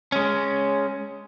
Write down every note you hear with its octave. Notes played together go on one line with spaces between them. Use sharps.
G#3 C#4